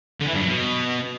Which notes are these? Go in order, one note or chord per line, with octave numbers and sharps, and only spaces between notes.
D3
E3
G2
F#3
B2